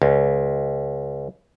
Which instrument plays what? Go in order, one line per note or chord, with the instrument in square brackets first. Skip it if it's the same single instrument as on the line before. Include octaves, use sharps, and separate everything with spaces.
[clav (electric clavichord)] C#2